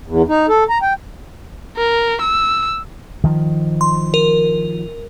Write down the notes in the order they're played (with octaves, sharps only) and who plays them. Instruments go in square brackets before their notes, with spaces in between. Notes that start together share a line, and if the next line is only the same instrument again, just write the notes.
[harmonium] E2
D#4
A4
A#5
G5
[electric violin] A#4
E6
[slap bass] D#3 F3
[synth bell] C6
A#4